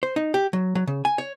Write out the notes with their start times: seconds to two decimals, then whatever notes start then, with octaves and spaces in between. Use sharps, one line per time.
0.03 C5
0.16 D#4
0.34 G4
0.53 F#3
0.75 F#3
0.87 C#3
1.05 G#5
1.18 C#5